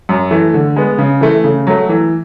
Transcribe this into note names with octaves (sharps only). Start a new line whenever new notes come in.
F#2
E3 A3
D3
G#3 B3
C#3
E3 A3
C#3
F#3 A3
E3